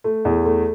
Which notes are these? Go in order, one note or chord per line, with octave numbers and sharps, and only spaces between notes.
A3
E2
A3